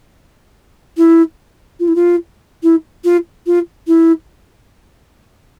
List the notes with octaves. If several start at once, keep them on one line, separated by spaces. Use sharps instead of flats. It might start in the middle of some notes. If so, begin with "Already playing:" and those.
E4
F4
E4
F4
E4
F4
F4
E4